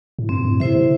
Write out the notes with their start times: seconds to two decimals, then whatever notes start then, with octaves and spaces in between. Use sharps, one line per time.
0.19 A2
0.29 G2 C4
0.45 A2
0.60 C3 E4 C5 E5
0.75 D3